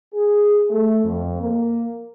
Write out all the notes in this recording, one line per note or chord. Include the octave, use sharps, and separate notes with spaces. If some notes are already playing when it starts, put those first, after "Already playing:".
G#4
A3
F2
A#3